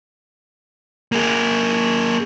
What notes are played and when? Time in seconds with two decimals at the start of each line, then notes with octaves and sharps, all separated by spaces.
1.12 A#3 G#4